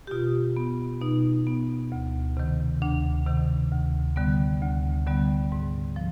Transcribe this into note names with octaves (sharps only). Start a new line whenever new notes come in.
G4
B2 F4
B3
B2 D#4
B3
D2
C3 D#3
D2 D4
C3 D#3
D2
D3 G3 B3
D2
D3 G3 B3
G#2
F3